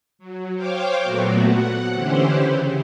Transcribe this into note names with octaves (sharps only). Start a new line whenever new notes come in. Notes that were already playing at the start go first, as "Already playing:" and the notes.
F#3
C5 C#5 F5 G5 D6
A#2 F#3 A3 B3 F#4
F#5
D3 E3 C#4 E4 G4 C5
C#3